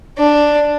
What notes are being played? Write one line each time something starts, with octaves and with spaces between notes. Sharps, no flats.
D4